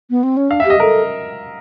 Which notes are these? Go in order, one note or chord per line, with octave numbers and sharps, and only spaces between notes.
B3
C4
C#4
D4 F5
E5
G4 D#5
A4 A#4